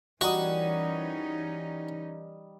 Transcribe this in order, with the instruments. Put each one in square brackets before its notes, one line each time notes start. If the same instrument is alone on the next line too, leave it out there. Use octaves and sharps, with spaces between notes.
[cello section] E3 C#4 D#4 [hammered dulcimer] G3 A#4 D#5 [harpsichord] F#4